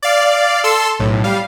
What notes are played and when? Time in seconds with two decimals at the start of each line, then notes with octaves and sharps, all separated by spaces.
0.02 D5 F5
0.64 A4 C6 E6
1.00 B1 A2
1.24 G3 F5